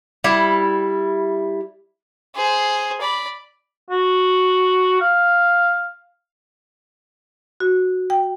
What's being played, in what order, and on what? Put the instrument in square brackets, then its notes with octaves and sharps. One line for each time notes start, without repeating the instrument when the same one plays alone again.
[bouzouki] G3 E4
[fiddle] G#4 C5
D5 B5
[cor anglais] F#4
F5
[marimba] F#4
G5